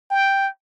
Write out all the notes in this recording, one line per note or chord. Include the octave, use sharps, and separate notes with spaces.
G5